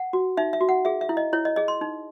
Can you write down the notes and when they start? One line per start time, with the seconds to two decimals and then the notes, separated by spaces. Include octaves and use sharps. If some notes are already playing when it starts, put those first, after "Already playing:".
Already playing: F#5
0.13 F#4
0.37 D#4 E5
0.53 E5
0.61 F#4
0.69 F#5
0.85 G#4 E5
1.01 E5
1.09 E4
1.17 D#5
1.33 E4 C#5
1.45 D#5
1.56 G#4 D#5
1.68 C6
1.81 D#4